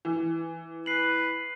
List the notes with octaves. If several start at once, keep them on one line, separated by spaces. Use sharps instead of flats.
E3
B4 C7 F#7